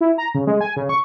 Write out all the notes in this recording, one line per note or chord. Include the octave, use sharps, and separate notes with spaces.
E4
A#5
C#3
G#3
G#5
C#3
C#6